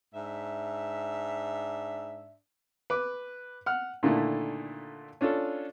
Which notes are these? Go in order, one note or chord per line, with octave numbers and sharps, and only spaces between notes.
G#2 D4 E5
B4 D6
F#5 F6
A#2 D3 D#3 A3 E4
C#4 D4 F4 A4